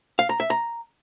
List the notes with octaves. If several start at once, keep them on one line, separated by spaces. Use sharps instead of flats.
F5
A#5
E5
A#5